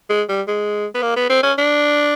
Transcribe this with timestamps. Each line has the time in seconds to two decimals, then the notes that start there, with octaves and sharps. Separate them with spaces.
0.10 G#3
0.29 G3
0.48 G#3
0.95 B3
1.02 A#3
1.16 B3
1.30 C4
1.43 C#4
1.58 D4